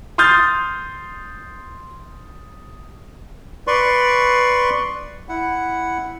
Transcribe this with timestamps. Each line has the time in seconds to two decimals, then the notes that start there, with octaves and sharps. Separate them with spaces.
0.18 C6 D#6 F6 G6 A6
3.67 B4 D5 C6 C#6
5.29 E4 F#5